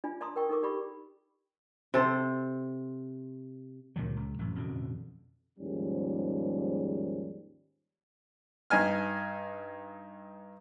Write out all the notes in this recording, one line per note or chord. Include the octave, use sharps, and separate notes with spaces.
D4 F4 D5 G#5
D5 A5 A#5 C6 D#6
A#4 G5 C#6
D#4 A4 A#4 C#6 D6
G4 D5 B5 C#6
C3 A4 C5
C#2 A#2 D#3 F#3
C#2
A1 F#2
A1 F2 B2 D3
D#2 G#2 F3 G3 C#4
G2 D#4 G#5 F6